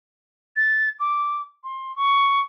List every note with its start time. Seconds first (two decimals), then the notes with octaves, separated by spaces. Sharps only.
0.56 A6
1.00 D6
1.64 C6
1.96 C#6